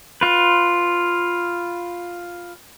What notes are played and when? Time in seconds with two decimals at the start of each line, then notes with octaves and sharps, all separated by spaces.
0.21 F4 B4